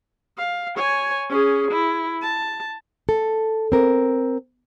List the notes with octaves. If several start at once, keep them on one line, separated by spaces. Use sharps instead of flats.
F5
C#5 G#5
C#4 G#4
E4
A5
A4
C4 A#4